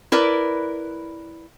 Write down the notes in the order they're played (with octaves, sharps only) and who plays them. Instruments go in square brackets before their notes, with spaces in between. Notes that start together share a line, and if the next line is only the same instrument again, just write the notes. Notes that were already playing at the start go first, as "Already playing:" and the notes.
[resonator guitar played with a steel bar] E4 A#4 B4 D5